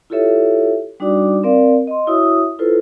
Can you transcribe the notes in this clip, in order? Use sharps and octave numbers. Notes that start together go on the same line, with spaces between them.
E4 F4 G4 A4 C#5 E5
G3 D4 D#4 F#4 D5 D6
C4 A#4 D5 F5
D#5 C6
E4 F#4 C#5 E5 D#6
E4 F4 A4 B4 C5